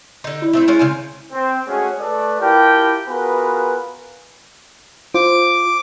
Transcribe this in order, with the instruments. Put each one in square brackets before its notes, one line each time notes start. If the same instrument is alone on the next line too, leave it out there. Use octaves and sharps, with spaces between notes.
[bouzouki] D3 D#4
[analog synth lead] E4
[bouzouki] A3 C4 E5
G#3 C#4 F4
C#3 C4 G#5
[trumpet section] C4
G#3 A3 C#4 F#4 G#4 C#5
A3 A4 B4 D5
E4 F4 G4 A#4 G5 A5
B3 F4 F#4 G#4 A#4 B4
[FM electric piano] F4 C5 [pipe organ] D6